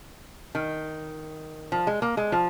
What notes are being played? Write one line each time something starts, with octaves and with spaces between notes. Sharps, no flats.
D#3
F3
G#3
A#3
G#3
F3